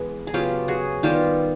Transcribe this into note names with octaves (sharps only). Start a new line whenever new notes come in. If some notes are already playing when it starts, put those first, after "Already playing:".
Already playing: E3 G#3 B3
G#4
C#3 F#3 B3 F4 G4
F#4 G#4
D#3 G3 B3 F4 G4